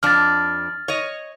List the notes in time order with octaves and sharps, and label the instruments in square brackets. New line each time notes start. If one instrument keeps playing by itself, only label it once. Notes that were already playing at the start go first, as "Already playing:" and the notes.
[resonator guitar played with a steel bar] F2 D4 [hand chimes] F6 A6
[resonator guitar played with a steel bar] C#5 D#5